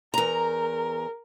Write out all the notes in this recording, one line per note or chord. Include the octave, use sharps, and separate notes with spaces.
E2 A#4 A#5